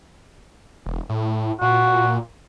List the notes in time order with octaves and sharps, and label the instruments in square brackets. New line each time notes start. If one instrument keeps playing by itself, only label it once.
[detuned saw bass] E1
A2
[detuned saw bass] A#2 [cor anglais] F#4